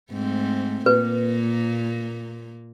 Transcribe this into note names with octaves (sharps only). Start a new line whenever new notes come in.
G#2 A3 C4
A#2 A#3 B4